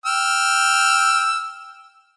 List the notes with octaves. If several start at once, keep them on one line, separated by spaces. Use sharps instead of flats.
G5 E6 F6